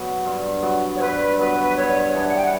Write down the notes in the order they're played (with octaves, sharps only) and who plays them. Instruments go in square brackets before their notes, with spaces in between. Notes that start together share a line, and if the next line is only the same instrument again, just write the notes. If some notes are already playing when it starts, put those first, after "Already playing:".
Already playing: [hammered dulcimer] F#3 B3 F#4
G2
F#3 B3 F#4
[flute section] C#5
[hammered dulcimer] G2 [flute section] B4
[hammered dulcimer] F#3 B3 F#4 [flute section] B4
[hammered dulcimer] G2 [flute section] C#5
[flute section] C#5
[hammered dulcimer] E3 B3 D4
[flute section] F#5
G5
F#5